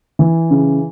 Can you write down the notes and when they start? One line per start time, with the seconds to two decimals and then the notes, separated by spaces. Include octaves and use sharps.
0.19 E3
0.50 C#3